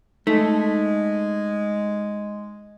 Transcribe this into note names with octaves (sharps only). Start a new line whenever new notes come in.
G#3 A3 D#4